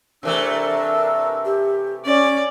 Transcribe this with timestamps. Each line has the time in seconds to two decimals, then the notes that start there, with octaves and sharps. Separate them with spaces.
0.23 C3 E3 A3 D4 A#4 E6
1.45 G4
2.06 C#4 D5